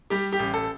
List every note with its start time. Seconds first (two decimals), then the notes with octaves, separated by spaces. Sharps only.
0.10 G3 G4
0.32 G4
0.39 A1
0.54 A4